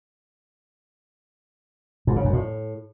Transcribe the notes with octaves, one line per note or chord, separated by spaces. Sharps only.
G#2
C#3
F#2
A2